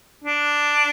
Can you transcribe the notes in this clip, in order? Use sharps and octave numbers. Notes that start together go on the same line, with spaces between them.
D4